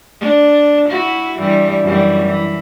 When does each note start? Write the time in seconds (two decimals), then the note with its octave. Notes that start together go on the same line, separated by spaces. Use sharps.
0.20 D4
0.89 E4 F#4
1.39 G2 E3 G3
1.84 F#2 E3 G3
2.25 E3